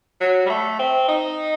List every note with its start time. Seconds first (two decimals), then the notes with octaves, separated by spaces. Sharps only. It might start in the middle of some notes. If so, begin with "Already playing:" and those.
0.21 F#3
0.46 G3
0.50 A3
0.79 C4
1.08 D#4